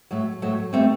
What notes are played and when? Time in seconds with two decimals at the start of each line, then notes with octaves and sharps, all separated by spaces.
0.11 A2 F#3 A3
0.42 A2 F#3 A3
0.73 D#3 G3 A3 C4